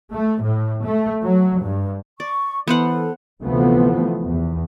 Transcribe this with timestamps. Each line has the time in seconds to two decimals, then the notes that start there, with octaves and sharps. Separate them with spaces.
0.13 A3
0.42 A2
0.85 A3
1.23 F#3
1.61 G2
2.20 D5 C#6
2.68 E3 B3 A4 C5 F#5
3.43 D2 C3 E3 F3 A3 B3
4.24 E2